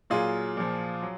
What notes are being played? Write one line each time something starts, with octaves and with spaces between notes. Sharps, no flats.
A#2 F#3 F4 G#4
A#2 F3
F#3